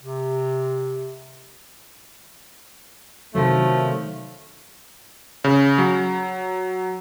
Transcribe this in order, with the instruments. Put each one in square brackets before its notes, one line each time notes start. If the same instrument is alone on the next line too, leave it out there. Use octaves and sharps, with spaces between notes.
[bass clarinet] C3
[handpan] C3 D#3 F#3 [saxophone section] F3 A3
[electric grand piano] C#3
F#3